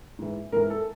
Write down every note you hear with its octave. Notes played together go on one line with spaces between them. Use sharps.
G#2 E3
G#2 E3 A#4
A4